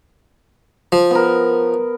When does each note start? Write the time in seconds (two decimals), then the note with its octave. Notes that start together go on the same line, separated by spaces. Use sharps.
0.92 F3
1.11 B3 A#4